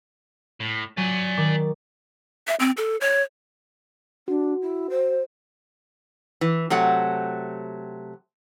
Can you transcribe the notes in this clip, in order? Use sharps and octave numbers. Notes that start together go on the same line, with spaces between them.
A2
F#3 D5 G#5
D#3 D6
E5
C4
A4
C#5
D4 F#4
E4
C5
E3
C3 F#3 A3 F#5